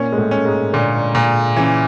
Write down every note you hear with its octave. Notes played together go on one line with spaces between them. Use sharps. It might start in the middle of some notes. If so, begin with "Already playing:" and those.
Already playing: A#2 A#3 C#4
G#3
A2 A3
C#4
G#2 G#3
A#2 D3 D4
A#2
C#3 E3 C#4